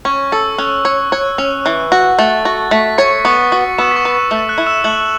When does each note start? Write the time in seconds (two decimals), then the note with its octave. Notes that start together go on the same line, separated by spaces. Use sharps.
0.05 C#4 C#6
0.32 A4 E6
0.58 C#4 F#6
0.85 C#5
1.12 C#5 F#6
1.38 C#4
1.65 E3 F#6
1.92 F#4
2.19 A3 A6
2.45 F#4
2.71 A3 B6
2.98 C#5 C#6 C#7
3.25 B3 C#6 C#7
3.52 F#4
3.78 B3 E6 E7
3.91 B6
3.96 C#6 C#7
4.05 B4
4.13 C#6
4.31 A3 E6
4.49 F#6
4.58 E4
4.67 E6 E7
4.84 A3 F#6 F#7